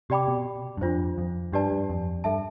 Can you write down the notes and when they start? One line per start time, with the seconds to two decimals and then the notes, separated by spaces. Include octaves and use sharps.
0.10 C3 G4 D5 G5 B5 D6
0.28 B2
0.77 G2
0.81 F2 D4 F4 C5
1.18 F2
1.52 G2 D4 G4 B4 D5 A5
1.71 G2
1.89 F2
2.24 G2 A4 E5 A5